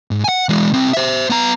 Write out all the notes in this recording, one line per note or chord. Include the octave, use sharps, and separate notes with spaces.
G#2
F#5 G#5
E3 G#3
C2 C4
C5 E5
B3 A#5